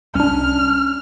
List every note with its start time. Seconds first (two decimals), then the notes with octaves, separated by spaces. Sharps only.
0.15 C2 C#4 D4 F6